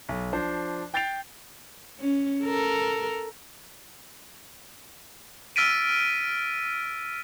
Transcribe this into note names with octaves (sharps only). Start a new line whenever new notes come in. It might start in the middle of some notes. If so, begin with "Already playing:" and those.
B1
F3 D4 C5
G5 G6 A6 C7 D7 F7
C#4
A4 A#4
E6 F6 A6 B6 D7 D#7